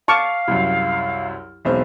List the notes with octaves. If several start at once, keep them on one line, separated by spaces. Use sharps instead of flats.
F5 A5 C#6 D6 F6
C2 F#2
E1 B1 C4